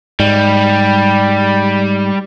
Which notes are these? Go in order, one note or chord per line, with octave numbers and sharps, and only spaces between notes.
G#2 G3